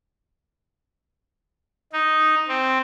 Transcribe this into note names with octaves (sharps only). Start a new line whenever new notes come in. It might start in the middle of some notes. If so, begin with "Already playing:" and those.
D#4
C4